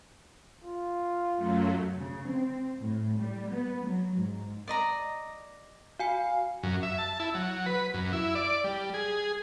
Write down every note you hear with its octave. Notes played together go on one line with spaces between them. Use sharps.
F4
F#2 F#3 A3
C#3
C4
A2
G3
B3
F#3
G#2
D5 D#5 A#5
F#4 F5 G#5 C#7
F#2
E5
A5
E4
F#3
B4
F#2
E4
D5
G3
G#4